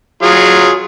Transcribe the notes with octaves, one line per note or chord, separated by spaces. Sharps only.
F#3 F4 G#4